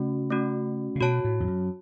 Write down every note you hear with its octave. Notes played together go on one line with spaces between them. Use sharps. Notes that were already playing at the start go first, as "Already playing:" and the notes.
Already playing: C#3 A3 C#4 F#4
A3 C#4 F#4
C#3
B2 F#4 C#5 A5
A2
E2
F#2